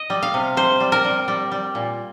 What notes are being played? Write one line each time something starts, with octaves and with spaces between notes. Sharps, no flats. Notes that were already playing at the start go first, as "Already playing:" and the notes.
Already playing: D#5
G3
F5
C3
C3 C5
G3
A#4
G3
G3
G3
A#2